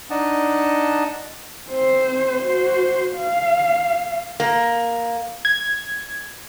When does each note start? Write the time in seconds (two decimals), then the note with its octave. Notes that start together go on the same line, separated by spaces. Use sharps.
0.10 D4 D#4 D#5 F#5 A5
1.68 C4 C5
2.43 F#4 C5
3.16 F5
4.40 A#3
5.45 G#6